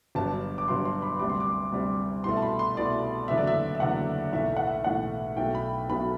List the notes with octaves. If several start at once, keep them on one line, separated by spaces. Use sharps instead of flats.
G1 G2 F#3 A5
D6
G1 G2 F#3 C6
C6
B5
D2 C3 G3 D6
C6
D6
D2 C3 G3
C2 B2 A3 C6
A5
B5
C6
C2 B2 A3 D5
F#1 E2 D3 F#3 A3 E5
D5
E5
E5
F#1 E2 D3 F#3 A3 F#5
B1 A2 E3 A3 E5
F#5
E5
B1 A2 E3 A3 F#5
B1 B2 F#3 A3 G5
B5
B1 B2 F#3 A3 B5